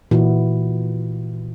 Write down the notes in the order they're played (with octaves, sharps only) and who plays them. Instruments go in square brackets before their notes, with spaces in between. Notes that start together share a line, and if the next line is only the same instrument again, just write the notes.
[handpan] A#2 E3 E4 F#4